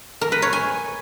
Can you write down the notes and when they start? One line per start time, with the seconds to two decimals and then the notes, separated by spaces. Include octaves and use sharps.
0.21 A#4
0.32 B4
0.42 C#5
0.53 G#5